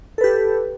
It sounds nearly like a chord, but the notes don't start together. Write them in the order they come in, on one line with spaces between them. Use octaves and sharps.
A4 B4 G4